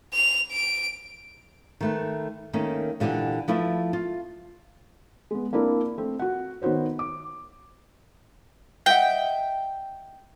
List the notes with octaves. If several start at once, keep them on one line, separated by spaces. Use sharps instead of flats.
F7
D7
D#3 A3 B4
D#3 A3 A#3 C#4
A#2 D3 E3 G4 F#5
F3 A3 E4 B4
F4
G#3 B3
A#3 C4 D4 E4 A#4
A3 C4
F#4 F#5
D#3 B3 F#4 C5 C#5
D6
D#5 E5 F#5 G5